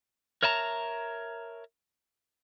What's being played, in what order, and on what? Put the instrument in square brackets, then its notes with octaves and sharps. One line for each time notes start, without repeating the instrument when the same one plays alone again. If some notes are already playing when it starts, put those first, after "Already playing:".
[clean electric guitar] A#4 C#5 E5 A5 A#5